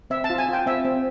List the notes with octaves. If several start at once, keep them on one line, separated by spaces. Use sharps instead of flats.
C4 E5
A5
F4
G#5
F4 G5
C4 E5
C4